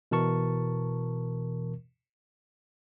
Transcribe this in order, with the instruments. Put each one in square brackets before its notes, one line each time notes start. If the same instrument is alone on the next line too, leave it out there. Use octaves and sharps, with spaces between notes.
[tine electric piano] B2 E3 A#4 A5 C#6